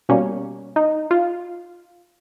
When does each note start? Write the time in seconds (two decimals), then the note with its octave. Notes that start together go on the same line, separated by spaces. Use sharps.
0.09 B2 G3 A#3 C#4
0.76 D#4
1.11 F4